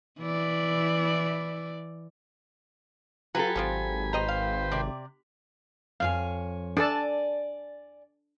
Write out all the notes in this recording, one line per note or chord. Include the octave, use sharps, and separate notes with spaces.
E3 E4 D5
F#3 F4 G4 A4 B4 G#5 B5
G#1 D3 F3 C4
C4 B4 C5 D#5 G5 A#5
F5
C3 G4 D5
F2 C#5 F5 G#5
D4 A4 D5 G#5 A5